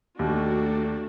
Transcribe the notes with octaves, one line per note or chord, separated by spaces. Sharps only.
D#2 A3 D4 F#4